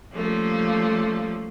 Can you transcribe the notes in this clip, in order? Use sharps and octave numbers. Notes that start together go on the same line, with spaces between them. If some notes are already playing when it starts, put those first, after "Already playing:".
F3 G3 A3 A#3 C#4